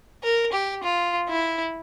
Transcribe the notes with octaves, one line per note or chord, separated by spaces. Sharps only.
A#4
G4
F4
E4